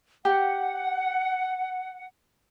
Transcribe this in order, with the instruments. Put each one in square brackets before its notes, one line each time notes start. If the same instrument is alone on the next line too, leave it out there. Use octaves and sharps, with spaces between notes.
[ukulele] G4 [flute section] F#5